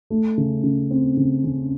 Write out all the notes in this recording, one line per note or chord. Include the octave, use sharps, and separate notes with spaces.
A3
C#3
C#3
C4
C#3
C#3